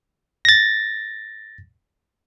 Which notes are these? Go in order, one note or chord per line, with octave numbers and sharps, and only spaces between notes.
A6 A#6